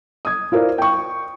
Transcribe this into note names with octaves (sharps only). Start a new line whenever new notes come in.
D#6 G#6
E4 F4 A#4 C5 D5
G5 C#6